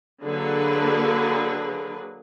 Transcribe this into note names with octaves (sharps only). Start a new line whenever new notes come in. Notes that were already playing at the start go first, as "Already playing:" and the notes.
D3 F#3 A#3 G#4 B4